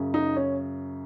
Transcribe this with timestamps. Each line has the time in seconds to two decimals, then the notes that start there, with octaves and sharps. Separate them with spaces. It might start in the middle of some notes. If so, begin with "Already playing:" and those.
Already playing: F#2 C#3
0.14 D#4
0.36 C#4